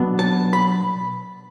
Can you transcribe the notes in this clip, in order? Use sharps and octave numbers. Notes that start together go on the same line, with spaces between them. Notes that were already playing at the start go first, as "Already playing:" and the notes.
Already playing: B2 F#3 B3 D4
A5
B5